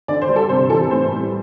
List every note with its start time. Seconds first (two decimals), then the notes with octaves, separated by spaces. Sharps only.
0.08 D3 D5
0.22 C5
0.28 G3
0.36 A4
0.49 C3 C5
0.70 E3 A4
0.91 A2 C5
1.11 G3